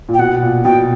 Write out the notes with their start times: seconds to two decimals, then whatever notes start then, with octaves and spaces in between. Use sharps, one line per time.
0.09 A#2
0.14 G5
0.19 B2 F#5
0.43 A#2
0.64 B2 G5